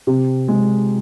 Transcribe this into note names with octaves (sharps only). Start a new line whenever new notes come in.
C3
G#3